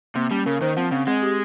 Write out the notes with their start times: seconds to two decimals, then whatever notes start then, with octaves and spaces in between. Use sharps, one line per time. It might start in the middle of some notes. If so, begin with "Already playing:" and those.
0.15 C3 A#3
0.31 G3 C#4
0.46 C#3 A#4
0.61 D#3 C5
0.77 F3 C4
0.91 C#3 C4
1.07 G#3 C4
1.22 G4